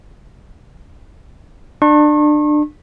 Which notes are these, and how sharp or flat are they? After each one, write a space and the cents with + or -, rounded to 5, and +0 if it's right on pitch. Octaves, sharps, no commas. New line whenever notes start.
D4 +25 C#6 -40